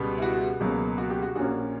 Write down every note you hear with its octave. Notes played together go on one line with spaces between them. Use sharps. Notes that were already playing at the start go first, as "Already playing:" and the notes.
Already playing: C#2 B2 G3 B3
E4
F#4
C#2 B2 F#3 A#3
F#4
G4
F#4
A#1 A#2 A#3 C#4 F#4